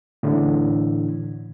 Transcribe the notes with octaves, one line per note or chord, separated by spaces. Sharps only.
A2 D3 E3